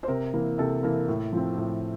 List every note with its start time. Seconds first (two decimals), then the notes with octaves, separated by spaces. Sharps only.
0.03 C5
0.08 C3 A#4
0.34 E3 A#3
0.58 C3 A4
0.83 E3 A#3 A4
1.08 A2
1.33 F3 C4
1.57 A2